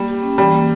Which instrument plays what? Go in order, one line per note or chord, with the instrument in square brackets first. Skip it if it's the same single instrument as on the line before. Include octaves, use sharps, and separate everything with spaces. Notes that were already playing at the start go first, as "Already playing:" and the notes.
Already playing: [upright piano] G3 [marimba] A#3
[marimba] G4
C#4
[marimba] E3 [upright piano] G3
[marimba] A#3